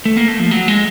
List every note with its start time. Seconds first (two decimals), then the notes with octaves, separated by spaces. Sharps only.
0.05 A3
0.17 A#3
0.28 A3
0.40 F3
0.51 F#3
0.68 G#3